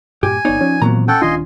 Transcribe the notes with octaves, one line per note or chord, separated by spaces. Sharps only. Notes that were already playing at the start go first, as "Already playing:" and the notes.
G2 A#2 G4 G#5
G1 B3 D#4 C#5 D5
F3 C#4
D#2 A#2 E3 F#3 B3 C4 A#5
C#4 A4 F#5 G5
D#1 D#3 D4 F4 D#5 G#5 C6